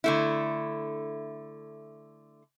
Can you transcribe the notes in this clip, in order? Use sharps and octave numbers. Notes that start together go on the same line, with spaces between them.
D3 A3 E4